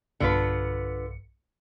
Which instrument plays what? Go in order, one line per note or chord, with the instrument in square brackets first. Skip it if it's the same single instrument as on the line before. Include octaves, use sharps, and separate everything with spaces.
[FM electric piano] B1 G2 C#7 [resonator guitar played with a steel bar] D3 F4 B4